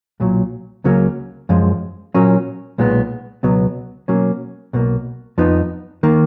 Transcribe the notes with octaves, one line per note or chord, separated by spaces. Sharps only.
B1 A#2 F#3
C#2 C#3 F#3 A#3 C#4
F#2 F3 G#3
A#2 F#3 A#3 C#4
B1 A#2 G#3 B3
C#2 B2 F#3 B3
B2 F#3 A#3 C#4
B1 B2 A#3
F2 F3 B3 D#4
D#3 A#3